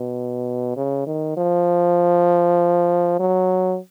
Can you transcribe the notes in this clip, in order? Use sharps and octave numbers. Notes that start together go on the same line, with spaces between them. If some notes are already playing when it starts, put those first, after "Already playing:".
Already playing: B2
C#3
D#3
F3
F#3